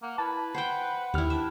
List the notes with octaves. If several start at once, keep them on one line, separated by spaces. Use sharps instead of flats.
A#3 F#5
E4 B4 A5
C5 F#5 G5
D#2 E4 G4 F6
D4 E5